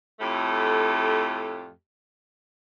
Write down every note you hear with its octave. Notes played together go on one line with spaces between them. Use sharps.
F2 A2 A3 G4 A4